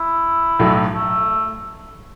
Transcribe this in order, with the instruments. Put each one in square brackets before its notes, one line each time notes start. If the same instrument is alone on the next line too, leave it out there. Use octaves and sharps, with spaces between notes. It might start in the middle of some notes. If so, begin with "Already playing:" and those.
Already playing: [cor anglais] E4
[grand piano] B1 A2 F#3 A3
[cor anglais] A3